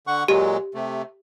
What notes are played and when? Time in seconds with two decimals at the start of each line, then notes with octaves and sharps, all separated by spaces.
0.07 D3 F#5 C#6
0.28 A#2 F#3 G#3 G4
0.75 C3 A3